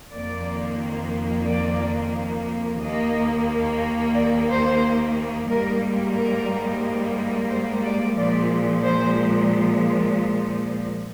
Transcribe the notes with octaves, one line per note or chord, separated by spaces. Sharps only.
F2 D#3 A#3 D5
D5
D#2 D#3 A#3 D#5
D5
C5
G#2 G3 A#3 A#4
A#4
C5
D5
A#2 F3 G#3 D5
C5